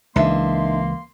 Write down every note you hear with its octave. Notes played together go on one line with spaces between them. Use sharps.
C#2 E3 A#3 D4 D#4 E5 C6